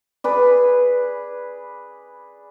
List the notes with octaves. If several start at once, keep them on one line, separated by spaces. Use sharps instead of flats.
G#4 B4 D5